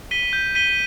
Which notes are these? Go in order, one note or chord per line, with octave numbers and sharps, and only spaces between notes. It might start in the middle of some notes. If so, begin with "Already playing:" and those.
B6 D#7 G7
G6
B6 D#7 G7